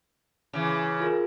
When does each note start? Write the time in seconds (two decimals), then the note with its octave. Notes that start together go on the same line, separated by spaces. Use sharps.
0.53 C#3 E3
1.00 F4 G#4 A#4